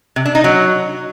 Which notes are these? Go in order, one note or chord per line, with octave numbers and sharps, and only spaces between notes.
C3
D4
D#4
F#3